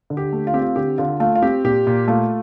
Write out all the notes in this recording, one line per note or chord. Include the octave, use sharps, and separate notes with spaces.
D3
G4
A3
F4
C4 G4
F4
D3 G4
D3 F4
A3 F4
F4
C4 G4
A#2 G4
A#2
A3 F4